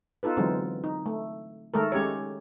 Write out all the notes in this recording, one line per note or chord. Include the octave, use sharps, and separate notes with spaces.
B3 D#4 F4 A4 B4
D3 E3 F#3 G#3 C4 D#4
D#4
A3
D#3 G#3 A3 A4 A#4
G#3 C#4 G4 G#4 C#5